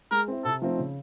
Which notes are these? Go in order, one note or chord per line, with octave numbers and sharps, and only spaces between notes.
G#3 A#4
C4 E4
C3 A4
F3 A3 C4 D#4
C#3